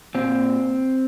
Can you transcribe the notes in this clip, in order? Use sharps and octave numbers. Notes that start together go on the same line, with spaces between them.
A#2 C4